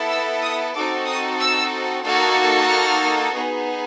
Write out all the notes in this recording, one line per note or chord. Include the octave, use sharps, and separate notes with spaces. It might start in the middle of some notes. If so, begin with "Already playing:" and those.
Already playing: B3 E4 A4
E6
D#6
C4 D#4 F#4 A4 D6
D#6
E6
A#3 D#4 F#4 A4
F6
B3 D#4 G#4